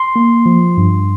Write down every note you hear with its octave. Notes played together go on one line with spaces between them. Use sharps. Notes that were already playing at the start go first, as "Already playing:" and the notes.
Already playing: C6
A#3
F3
G2